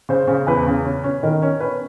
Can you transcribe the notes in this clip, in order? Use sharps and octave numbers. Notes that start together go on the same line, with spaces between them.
C#3 C5
C#3
E2 B4
C#3
C#4
C#4
D#3 A#4
C#4
C#4 B4